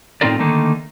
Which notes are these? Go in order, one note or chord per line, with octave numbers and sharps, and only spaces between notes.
A2 C4 D#4 F4 A#4 D5
D3 D#3 A3 A#3 D#4